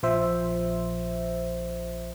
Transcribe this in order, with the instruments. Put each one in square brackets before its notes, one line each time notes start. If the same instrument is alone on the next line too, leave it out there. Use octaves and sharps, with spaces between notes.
[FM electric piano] A#1 F3 C5 E5